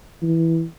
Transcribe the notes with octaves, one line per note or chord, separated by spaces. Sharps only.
E3